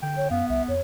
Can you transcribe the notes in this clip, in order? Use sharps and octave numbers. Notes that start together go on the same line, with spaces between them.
D3 G5
C#5
F#2 B3 F5
C2 E5
F2 C#5